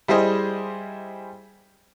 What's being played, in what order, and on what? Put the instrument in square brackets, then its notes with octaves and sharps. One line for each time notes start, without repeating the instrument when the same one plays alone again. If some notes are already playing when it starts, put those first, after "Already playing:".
[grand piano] G3 E4 G4 G#4 C5 D#5